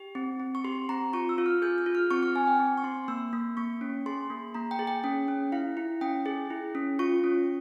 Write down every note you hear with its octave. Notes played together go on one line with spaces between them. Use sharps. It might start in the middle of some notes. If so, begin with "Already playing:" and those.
Already playing: G4
C4
C4
C#6
G4 C6
C4 A#5
F4 C#6
E6
F4
F6
G#4 G6
G6
F4
F6
C4 C#6
F6
C4 G#5
G5
C4
C#6
C4 C6
A#3 E6
A#3
A#3 C#6
C#4
G#4 C6
A#3
A#3 A#5
G5
G#4
G5
C#4 G5
C#4
E4 F5
E4
C#4 G5
G#4
E4
C#4
F4 C#6
C#4